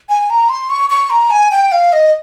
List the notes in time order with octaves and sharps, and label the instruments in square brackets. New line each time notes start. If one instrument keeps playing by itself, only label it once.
[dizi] G#5
A#5
C6
C#6
C#6
A#5
G#5
G5
F5
D#5